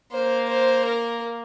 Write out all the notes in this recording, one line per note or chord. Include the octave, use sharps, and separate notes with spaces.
A#3 C5
C5
A#4